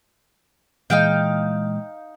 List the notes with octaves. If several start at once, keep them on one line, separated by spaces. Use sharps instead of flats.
A#2 E3 G#3 D#4 F5 G5